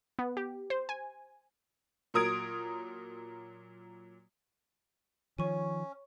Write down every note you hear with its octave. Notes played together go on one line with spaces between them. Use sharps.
B3
G4
C5
G#5
A#2 F#3 A#4 D#6 G#6 D7
D#3 F3 C#4 C#5 C#6 D#7